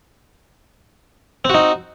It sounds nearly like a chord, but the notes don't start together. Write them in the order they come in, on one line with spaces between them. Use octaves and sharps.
C4 F#4 D#4